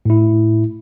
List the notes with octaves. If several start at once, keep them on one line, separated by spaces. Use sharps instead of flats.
A2 E4